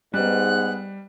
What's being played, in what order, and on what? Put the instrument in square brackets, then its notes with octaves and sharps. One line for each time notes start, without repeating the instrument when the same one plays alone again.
[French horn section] G#2 B3 [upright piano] G3 [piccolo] F#6